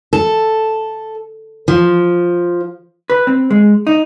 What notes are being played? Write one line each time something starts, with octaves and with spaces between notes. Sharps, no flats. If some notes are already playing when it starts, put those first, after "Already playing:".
A4
F3
B4
C4
G#3
D#4